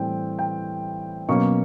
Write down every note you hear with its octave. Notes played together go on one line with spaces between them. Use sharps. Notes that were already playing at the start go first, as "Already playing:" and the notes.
Already playing: A2 E3 G3 C4 G5
G5
B2 F#3 A#3 C#4 C#6